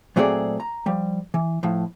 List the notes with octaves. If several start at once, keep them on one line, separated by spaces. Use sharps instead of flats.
A#2 F#3 A3 C4 G#4 D5
A#5
F3 G3
E3
A2 F3